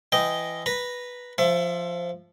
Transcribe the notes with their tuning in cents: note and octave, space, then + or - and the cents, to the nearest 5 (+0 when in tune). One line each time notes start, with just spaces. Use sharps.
E3 +20 D#5 +0 G5 -10
B4 -5 A#5 +0
F3 +0 E5 +25